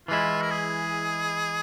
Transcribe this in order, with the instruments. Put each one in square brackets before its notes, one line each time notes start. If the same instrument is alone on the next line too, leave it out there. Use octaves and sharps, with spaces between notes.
[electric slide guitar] E3 G#3 E4 [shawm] F4
[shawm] A#4
G#4